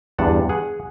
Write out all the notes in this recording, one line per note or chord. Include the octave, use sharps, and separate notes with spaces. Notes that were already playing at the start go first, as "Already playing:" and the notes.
E2 G2 F#5 A5
G#4 F#5